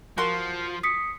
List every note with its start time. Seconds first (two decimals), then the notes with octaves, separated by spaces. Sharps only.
0.18 F3 F#4 A#4 C6
0.83 D#6 B6 C#7